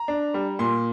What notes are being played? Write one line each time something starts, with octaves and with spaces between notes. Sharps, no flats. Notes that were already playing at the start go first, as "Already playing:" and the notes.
Already playing: A#5
D4
G3
A#2 C6